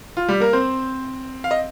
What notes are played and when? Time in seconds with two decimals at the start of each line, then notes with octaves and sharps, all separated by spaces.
0.17 F4
0.29 G3 G4
0.40 A#3 A#4
0.53 C4 C5
1.44 F5
1.51 D#5